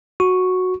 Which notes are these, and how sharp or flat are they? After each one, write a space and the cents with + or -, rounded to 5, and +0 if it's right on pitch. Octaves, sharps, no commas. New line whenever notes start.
F#4 -5 C#6 +0